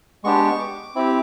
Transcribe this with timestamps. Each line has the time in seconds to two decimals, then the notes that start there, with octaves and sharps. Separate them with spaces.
0.24 G#3 B3 D4 G4 C#6
0.59 D6
0.95 C4 E4 G4